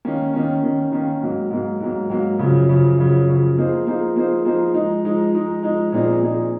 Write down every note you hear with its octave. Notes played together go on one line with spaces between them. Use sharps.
D#3 A#3 C#4
D#3 A#3 C#4
D#3 A#3 C#4
D#3 A#3 C#4
G#2 F#3 A#3
G#2 F#3 A#3
G#2 F#3 A#3
G#2 F#3 A#3
F#2 C#3 F3
F#2 C#3 F3
F#2 C#3 F3
F#2 C#3 F3
F3 A#3 D#4 G#4 C5
F3 A#3 D#4 G#4 C5
F3 A#3 D#4 G#4 C5
F3 A#3 D#4 G#4 C5
F3 G#3 D#4
F3 G#3 D#4
F3 G#3 D#4
F3 G#3 D#4
A#2 F3 C4 D#4 G#4
A#2 F3 C4 D#4 G#4